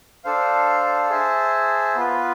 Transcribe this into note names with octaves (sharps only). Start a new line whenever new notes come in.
D4 A4 C5 F5
G#4 C5 E5 A5
B3 F4 B4